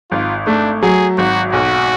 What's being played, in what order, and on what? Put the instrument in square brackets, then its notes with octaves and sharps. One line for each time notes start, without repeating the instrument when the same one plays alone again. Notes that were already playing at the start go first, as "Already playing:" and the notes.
[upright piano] G#1 [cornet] F4
[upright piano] A3 [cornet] D4
[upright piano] F#3 [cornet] G#4
[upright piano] G#1 [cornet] F#4
[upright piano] B1 [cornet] F#4